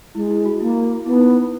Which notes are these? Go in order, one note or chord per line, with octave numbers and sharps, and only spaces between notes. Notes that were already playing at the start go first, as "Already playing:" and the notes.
G#3 E4
E4
F#4
A#3 E4
B3 E4
D#4
E4